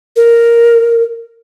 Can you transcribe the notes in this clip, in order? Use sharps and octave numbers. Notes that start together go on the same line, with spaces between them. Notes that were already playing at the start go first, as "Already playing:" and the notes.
A#4